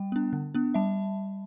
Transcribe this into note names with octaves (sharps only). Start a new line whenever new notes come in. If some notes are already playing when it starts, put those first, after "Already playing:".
Already playing: G3 G5
B3 D4
D3
B3 D4
G3 E5 A5